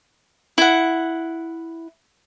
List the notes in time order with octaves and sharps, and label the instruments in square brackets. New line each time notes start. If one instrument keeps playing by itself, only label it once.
[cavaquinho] E4 F#5